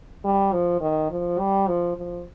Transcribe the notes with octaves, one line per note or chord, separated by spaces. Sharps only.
G3
F3
D#3
F3
G3
F3
F3